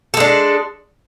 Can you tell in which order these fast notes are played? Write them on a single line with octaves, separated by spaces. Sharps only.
A4 G#3 D4